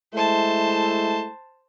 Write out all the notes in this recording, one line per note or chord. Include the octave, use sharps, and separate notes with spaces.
G#3 A3 E4 C5 A5